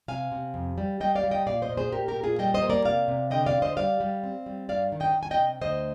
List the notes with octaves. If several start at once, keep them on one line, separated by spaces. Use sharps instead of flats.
C3 F5 G#5
C3
F2
G3
G3 D#5 G5
D5 F5
G3
D#5 G5
A#2 D5 F5
C5 D#5
A#2
G#4 C5
A#2 G4 A#4
G4 A#4
A#2
F4 G#4
G3 D#5 G5
C5 D#5
A#3
A#4 D5
C3 D5 F5
C3
D3 D#5 G5
D5 F5
D3
C5 D#5
G3 D5 F5
G3
C4
G3
G2 D5 F5
D#3
D#5 G5
D#3
G#5
D#5 G5
C3
D2 C5 D#5